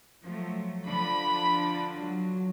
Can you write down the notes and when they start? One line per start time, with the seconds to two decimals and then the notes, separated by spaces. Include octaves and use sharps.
0.25 F3 F#3 A3
0.87 D3 F3 D4 B5
1.98 F#3